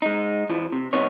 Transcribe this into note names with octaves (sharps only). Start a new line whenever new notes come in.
G#3 D#4
F2 E3 F3
C3
C2 C3 D#3 B3 D#4 C#5